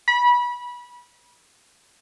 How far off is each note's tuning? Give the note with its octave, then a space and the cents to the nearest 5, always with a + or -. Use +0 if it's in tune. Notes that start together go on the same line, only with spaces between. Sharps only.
B5 -30